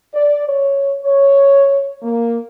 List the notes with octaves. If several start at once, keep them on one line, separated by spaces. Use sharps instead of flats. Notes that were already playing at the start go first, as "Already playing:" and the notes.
D5
C#5
C#5
A#3